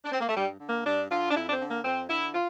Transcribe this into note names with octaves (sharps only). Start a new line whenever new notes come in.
D4
C4
A#3
A3
G2 G3
D3
A#3
G2 D4
D3 F4
D4
F2 E4
D4
C4
D3
A#3
F2 C4
D3 E4
F4